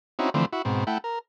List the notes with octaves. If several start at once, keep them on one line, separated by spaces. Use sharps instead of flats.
C4 C#4 D#4 E4 F#4
D3 E3 F3 A3 C4
E4 F#4
G#2 B2 C4
A3 E4 F#5 G5
A#4